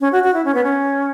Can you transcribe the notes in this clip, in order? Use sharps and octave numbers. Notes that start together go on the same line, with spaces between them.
C#4
F#4
F#4
E4
C#4
B3
C#4